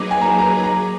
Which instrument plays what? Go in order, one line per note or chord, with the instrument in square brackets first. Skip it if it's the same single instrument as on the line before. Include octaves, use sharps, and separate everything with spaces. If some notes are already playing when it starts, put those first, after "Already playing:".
Already playing: [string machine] F#3 A#3 D#4 G#4 B4 [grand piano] D6
[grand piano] G#5
A#5
G#5
A#5
A#5